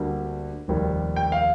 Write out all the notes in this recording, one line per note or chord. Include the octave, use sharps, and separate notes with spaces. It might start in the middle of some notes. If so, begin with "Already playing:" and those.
Already playing: D2 D3 G3 A#3
F1 D#2 D#3 G3
G5
F5